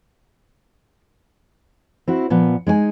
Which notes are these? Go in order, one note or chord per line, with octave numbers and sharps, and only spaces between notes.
C4 E4 F#4
A#2 F3 B3
G#3 D#4 C#5 G#5